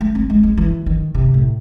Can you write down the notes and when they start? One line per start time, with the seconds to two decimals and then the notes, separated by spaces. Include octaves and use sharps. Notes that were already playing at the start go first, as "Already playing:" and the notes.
0.01 A3
0.15 C4
0.30 G#3
0.43 G#3
0.57 E3
0.86 D#3
1.14 C3
1.34 A2